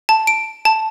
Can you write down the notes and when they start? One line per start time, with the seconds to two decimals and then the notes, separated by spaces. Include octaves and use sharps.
0.09 A5
0.27 D7
0.65 A5